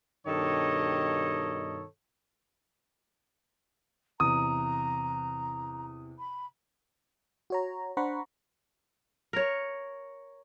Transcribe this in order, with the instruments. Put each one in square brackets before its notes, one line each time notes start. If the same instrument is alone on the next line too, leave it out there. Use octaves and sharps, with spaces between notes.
[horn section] G2 B2 D#3 A4 C#5 D#5
[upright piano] E2 C3 [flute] A#5 [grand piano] D#6
[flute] B5
[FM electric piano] F#4 C#5 A#5
D4 C5 F#5 A#5 B5 C#6
[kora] A#4 C#5